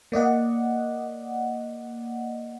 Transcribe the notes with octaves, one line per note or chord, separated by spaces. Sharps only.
A#3 D5 D#5 F#5